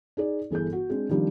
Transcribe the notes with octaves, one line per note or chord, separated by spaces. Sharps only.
D#4 G#4 D5
G1 E3 G#4 A4 G6
F#4
G#3 C4 D4
D#3 F3 G3 C4 D4